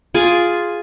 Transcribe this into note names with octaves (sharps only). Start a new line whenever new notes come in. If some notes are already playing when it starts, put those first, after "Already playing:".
F4 G#4 D5 G#5